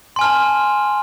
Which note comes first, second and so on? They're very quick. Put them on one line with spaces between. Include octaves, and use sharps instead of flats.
C6 G#5 F6 A5